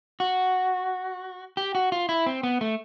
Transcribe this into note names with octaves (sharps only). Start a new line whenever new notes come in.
F#4
G4
F#4
F4
E4
C4
B3
A3